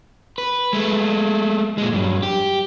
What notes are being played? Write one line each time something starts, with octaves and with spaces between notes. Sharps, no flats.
B4
G#3 A3
A#2 G#3
G2 F#3
G4